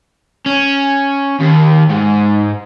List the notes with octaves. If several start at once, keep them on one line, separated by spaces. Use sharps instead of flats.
C#4
D#2
G#2